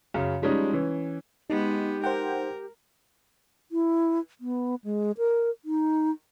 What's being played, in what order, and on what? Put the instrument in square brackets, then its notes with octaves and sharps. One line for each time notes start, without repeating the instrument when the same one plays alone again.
[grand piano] F#2 C#3
F3 G3 G#3 C#4 D#4
E3 C#4
[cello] G#3 B3 [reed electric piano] D#4 [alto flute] G4
[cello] A#4 [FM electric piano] C5 F#5 G5
[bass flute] E4
B3
G#3
A#4
D#4